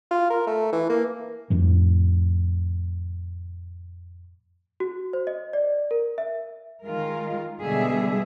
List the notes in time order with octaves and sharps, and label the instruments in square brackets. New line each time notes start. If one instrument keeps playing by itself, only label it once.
[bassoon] F4
A#4
A3
E3
A#3
[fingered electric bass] F2 A2 F3
[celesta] F#4
C5
D#5
D5
A#4
E5
[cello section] D#3 G#3 F4 A#4
B2 D3 G3 G#3 G#4 E5